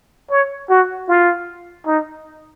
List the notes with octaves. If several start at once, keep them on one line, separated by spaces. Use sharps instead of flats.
C#5
F#4
F4
D#4